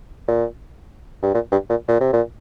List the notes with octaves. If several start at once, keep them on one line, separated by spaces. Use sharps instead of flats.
A#2
G2
A#2
G2
A#2
A#2
C3
A#2